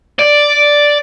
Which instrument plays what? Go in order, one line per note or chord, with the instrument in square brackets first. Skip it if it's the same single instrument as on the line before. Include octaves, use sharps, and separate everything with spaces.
[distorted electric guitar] D5